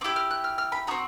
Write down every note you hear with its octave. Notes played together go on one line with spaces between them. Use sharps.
C4 D6
E4 G4
F6
F#6
F6
F6
B5
C4 D#4 F#4 A#5